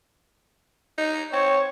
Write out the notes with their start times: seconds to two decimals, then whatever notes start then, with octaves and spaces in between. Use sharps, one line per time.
0.98 D#4
1.33 C4 C#5